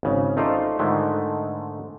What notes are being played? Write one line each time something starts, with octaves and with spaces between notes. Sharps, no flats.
G#1 C#3
A3 D#4 F4 C5 D5
G#2 D3 D#3 G#3 A3